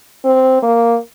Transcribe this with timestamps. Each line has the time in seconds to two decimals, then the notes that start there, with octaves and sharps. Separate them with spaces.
0.25 C4
0.62 A#3